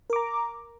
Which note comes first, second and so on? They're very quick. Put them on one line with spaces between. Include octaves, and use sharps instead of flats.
A#4 D6 A#5